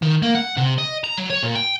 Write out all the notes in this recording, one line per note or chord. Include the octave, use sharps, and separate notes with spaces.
D#3
A#3
F#5
C3
D#5
A#5
F#3
C#5
A#2
G5